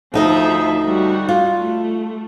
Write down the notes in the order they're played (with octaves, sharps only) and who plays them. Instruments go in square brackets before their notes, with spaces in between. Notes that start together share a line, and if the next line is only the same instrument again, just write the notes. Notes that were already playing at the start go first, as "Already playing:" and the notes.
[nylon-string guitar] D2 D#4 D#5 [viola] F3 E5
[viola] G3 F#4
[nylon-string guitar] F4
[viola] A3